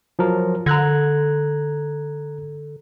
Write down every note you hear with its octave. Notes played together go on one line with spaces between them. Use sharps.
F3 F#3 A#4
D3 A#5 F#6 G#6